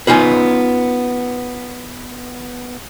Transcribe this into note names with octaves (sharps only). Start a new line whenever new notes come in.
B3 C#4 D#4 F4 B4